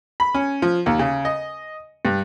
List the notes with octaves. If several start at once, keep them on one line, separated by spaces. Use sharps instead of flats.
B5
C#4
F3
D#2
C#3
D#5
G2